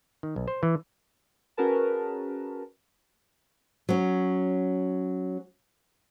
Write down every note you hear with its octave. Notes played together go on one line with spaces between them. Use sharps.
D#3
B1
C5
E3
C#4 F#4 G#4 A#4 B4 A5
F#3 C#4